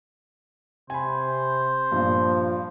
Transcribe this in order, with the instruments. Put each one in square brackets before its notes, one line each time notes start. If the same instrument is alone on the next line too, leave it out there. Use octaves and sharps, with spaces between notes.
[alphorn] C3 [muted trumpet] C5 [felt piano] G#5 B5
[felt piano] G2 A#2 [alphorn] F3